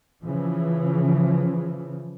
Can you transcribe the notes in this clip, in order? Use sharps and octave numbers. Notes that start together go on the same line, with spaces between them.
C#3 E3 F3